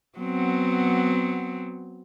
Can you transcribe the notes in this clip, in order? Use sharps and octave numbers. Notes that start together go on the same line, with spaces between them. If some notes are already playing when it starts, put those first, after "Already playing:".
F#3 B3 C4